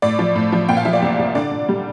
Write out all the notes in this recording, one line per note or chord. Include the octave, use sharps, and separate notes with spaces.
A2 D5
F3
A2
F3
A#2 G5
F5
F3 E5
D5
C2
C2
D3 D5
D3
G3